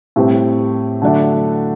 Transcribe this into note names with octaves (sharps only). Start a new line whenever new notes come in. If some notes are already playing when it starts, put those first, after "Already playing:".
A2 G3 C4
D3 F#3 A3 D4